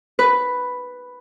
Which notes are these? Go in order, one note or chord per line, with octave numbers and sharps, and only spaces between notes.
B4